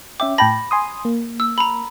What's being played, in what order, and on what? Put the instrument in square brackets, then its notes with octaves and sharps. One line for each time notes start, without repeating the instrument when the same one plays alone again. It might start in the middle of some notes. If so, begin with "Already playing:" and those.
[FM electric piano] C#4 E5 G5 [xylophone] D6
[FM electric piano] A2 G5 A5 [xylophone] B5 A#6
[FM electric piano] G#5 C6 D#6
A#3
[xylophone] E6
A#5 B5